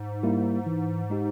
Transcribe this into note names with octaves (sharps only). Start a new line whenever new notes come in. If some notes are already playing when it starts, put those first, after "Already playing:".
Already playing: G#2
G3 A#3 E4
E3
G#3 D#4 G4